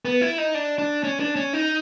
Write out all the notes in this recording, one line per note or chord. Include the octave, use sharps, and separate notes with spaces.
B3
E4
D#4
D4
D4
C#4
D4
C#4
D#4